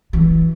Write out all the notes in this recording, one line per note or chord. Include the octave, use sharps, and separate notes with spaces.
E3